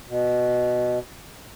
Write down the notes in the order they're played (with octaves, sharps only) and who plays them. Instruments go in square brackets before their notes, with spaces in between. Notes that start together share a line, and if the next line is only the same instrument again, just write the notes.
[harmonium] B2